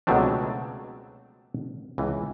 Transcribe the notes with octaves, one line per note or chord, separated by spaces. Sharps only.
C#2 B2 F#3 A3 C4 D4
C#2 E3